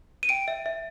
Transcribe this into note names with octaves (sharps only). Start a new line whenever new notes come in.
D#7
G5 D7
E5
E5